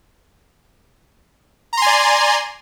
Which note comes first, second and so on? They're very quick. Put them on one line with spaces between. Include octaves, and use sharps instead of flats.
A#5 C6 G#5 D5